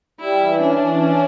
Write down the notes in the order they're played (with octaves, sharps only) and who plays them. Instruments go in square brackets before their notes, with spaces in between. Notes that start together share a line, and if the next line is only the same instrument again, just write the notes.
[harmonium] G3 [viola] E4
[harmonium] E3
[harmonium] C#4 [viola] D4
[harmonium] E3
C#4